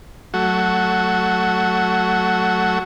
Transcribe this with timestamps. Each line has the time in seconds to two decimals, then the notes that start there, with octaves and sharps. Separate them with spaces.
0.34 F#3 A3 F#4